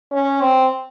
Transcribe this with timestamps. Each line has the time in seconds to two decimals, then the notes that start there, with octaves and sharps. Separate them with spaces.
0.12 C#4
0.41 C4